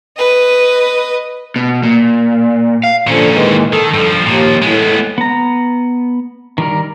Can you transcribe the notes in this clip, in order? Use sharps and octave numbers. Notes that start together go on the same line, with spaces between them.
B4 D#5
B2
A#2
F5
A#2 D3 F3 C#4
D#3 E3 G#3
D#3 A4
G2 F3
D#2 A#2 F3
A2 G#3 B3
B3 A#5
D#3 G3 A#4